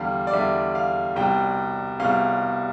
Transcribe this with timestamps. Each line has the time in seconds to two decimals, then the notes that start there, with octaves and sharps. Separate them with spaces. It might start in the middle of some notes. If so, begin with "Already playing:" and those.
Already playing: E2 D3 G3 F5
0.27 D5
0.33 E2 D3 G3 E5
0.75 F5
1.16 C2 B2 G3 G5
2.00 C2 B2 G3 F5